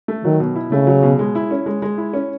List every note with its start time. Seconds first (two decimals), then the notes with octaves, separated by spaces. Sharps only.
0.08 A3
0.24 D#3 F#3
0.40 B2
0.55 E4
0.71 C#3 A3
0.87 F#3
1.03 B2
1.19 G#3
1.35 E4
1.51 C#4
1.66 G#3
1.82 G#3
1.98 E4
2.13 C#4